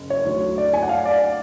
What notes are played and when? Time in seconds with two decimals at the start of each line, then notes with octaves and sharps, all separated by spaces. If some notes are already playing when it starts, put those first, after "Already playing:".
Already playing: F#1
0.10 C#5
0.25 D2 D3 F#3
0.58 D5
0.74 G#5
0.82 F#5
0.89 F5
1.05 D5